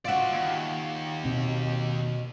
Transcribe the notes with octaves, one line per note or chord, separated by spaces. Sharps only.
F4 F#4 D5 E5
D#2
B2 C4